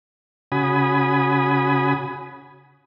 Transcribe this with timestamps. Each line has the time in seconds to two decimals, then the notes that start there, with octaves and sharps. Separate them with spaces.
0.52 C#3 F#4 G#5 B5 D#6